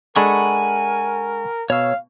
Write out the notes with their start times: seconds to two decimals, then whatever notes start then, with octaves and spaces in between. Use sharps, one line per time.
0.16 G#3 D4 A4 A#4 F#5 G#5 B5 C#6
1.70 B2 C#5 F5 E6